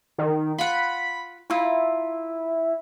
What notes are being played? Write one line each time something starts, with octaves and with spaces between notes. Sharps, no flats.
D#3
F4 F#5 B5
E4 F4 A#5